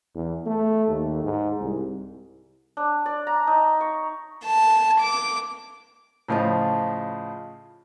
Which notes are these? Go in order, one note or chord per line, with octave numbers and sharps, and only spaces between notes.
E2
A3
D#2
G#2
C2
D4
D5
A#5
D#4
C#6
A5
D6
A2 C#3 F3 F4 D#5 A5